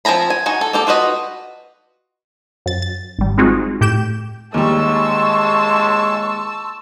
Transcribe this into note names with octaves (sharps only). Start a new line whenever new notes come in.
F3 C4 G#5 A#5 B5
G#5
D#4 F#4 G#5
A4
A#3 G4 A4
F4 F#4 B4 D#5
F#2 A6
A6
G#1 G3
G#3 C4 D#4 F4 F#4 G#4
A2 G4 G5 G6 E7
D#2 G3 G#3 A5 C6 C#6 E6